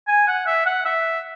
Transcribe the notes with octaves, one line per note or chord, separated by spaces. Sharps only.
G#5
F#5
E5
F#5
E5